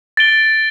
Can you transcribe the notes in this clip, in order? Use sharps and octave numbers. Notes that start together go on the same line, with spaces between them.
A6 D7 G7